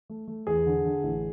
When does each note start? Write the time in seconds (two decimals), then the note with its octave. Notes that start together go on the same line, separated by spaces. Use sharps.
0.09 A3
0.28 A3
0.47 E2 G#4
0.66 D3
0.85 D3
1.04 A1